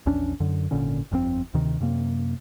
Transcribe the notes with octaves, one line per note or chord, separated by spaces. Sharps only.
A#1 E2 C#4 D4
F#2 D3
G#1 A#2 D3 C#4
G1 F2 A2 C4
D2 C3 D#3
F#2 C3 A#3